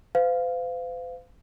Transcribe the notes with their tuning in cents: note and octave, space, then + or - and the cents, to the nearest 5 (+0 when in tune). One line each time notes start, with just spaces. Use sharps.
C5 -45 F5 +0